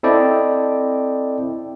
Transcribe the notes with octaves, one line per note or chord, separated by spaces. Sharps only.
C4 E4 A4 D5 D#5 G5